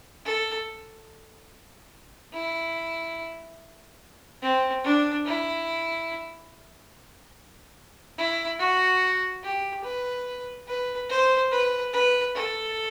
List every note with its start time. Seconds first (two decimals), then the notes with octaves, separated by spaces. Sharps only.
0.25 A4
2.33 E4
4.42 C4
4.84 D4
5.26 E4
8.18 E4
8.59 F#4
9.43 G4
9.84 B4
10.68 B4
11.10 C5
11.52 B4
11.93 B4
12.35 A4